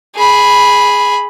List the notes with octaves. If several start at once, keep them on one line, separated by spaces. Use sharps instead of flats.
G#4 B5